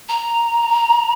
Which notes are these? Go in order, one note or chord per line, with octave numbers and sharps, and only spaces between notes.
A#5